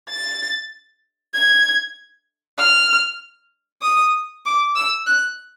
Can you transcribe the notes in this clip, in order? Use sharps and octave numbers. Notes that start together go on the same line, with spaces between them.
A6
G#6
F6
D#6
D6
E6
F#6